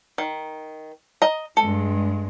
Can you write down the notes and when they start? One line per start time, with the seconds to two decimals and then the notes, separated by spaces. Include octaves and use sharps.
0.18 D#3
1.22 D#5 A#5
1.57 G2 G#3 A4